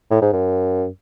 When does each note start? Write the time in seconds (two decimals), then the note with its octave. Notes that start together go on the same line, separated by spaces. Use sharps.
0.11 A2
0.22 G#2
0.33 F#2